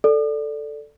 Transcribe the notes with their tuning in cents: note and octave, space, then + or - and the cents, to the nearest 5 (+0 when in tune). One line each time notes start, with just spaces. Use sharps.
A4 +0 D5 +0